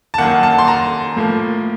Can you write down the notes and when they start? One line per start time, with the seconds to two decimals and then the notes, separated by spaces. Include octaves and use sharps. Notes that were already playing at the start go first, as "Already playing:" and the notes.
0.14 A5
0.18 F#2 D#3 A#3 F#5
0.43 A5
0.58 C6
0.68 A#5
1.16 A2 F3 A#3